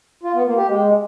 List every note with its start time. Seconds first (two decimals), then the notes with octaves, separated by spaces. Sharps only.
0.23 F4
0.34 B3
0.46 A#3
0.57 G4
0.68 G#3